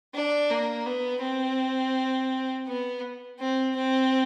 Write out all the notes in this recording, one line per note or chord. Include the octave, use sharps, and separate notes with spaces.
D4
A#3
B3
C4
B3
C4
C4